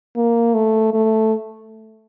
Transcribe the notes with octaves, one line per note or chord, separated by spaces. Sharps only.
A#3
A3
A3